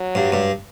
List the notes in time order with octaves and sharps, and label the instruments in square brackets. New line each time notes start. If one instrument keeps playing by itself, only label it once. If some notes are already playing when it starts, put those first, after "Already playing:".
Already playing: [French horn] F#3
[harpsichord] G2
G2